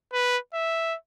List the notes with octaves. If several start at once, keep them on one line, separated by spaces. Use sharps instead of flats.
B4
E5